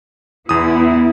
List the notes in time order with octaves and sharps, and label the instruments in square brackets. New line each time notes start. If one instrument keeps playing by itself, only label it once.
[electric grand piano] E2 D#6 [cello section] B3 E4